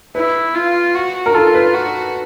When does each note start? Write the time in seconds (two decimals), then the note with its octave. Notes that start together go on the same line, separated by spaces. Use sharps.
0.15 E4 B4
0.55 F4
0.95 F#4
1.26 A#4
1.34 F4 A4
1.54 B4
1.74 F#4